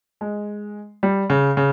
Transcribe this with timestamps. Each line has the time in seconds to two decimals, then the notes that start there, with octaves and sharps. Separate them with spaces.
0.21 G#3
1.03 G3
1.30 C#3
1.57 C#3